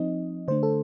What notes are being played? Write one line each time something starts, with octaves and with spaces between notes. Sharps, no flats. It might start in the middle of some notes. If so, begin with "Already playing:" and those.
Already playing: F3 C4 D#4 D#5
D3 A3 D4 C5
A4